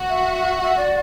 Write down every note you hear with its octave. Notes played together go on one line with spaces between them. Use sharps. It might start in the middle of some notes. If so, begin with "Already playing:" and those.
Already playing: F#4
E5
E5
D5